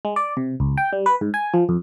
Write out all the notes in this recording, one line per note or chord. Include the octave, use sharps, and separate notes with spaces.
G#3
D5
C3
C#2
G5
G3
B4
G#2
G#5
F3
F2